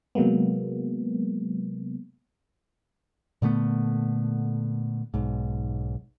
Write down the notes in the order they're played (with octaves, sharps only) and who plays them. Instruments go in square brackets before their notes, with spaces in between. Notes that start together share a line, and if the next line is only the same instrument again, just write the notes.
[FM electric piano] C3 F#3 G#3 A#3 B3
[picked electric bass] A#2 D3 A3 B3
B1 G#2